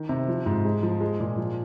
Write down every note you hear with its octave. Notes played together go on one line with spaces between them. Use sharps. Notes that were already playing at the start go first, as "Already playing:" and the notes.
Already playing: D#3
C3
F3
G#2
G#3
F3
G#3
A#2
F3